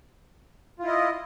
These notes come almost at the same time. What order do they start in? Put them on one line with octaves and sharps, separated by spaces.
F4 E4 D#5